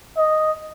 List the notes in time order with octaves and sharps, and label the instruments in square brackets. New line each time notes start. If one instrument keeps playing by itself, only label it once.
[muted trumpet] D#5